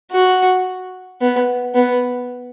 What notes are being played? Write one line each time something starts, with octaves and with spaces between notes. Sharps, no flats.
F#4
B3
B3